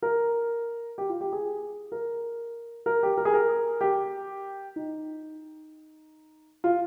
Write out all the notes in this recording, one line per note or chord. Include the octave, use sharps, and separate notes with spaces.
A#4
G4
F4
G4
G#4
A#4
A#4
G4
A#4
G#4
A#4
G4
D#4
F4